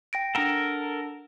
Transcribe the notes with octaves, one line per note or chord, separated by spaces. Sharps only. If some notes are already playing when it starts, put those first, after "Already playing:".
G5 A#6 D7
D4 A4 A#4 F#5